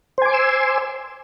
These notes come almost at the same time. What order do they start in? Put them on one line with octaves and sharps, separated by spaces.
C5 G#5 D6 C6 E6